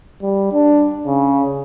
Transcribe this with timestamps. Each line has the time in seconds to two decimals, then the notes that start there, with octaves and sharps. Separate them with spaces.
0.23 G3
0.53 D4
1.07 C#3